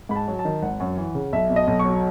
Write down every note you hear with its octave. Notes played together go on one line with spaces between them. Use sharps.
G#2 B5
A5
F#3
A5
D#3
G#1 F#5
F#2
E3
C#3
B1 E5
B2
D#5
B1
C#6
F#3